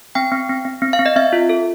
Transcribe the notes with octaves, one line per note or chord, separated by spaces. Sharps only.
C4 G5
C4
C4
C4
C4
F5
C4
D#5
C4 E5
F4
A4